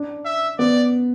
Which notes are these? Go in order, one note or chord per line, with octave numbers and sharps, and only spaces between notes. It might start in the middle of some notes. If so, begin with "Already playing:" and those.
Already playing: D4
E5
B3 D5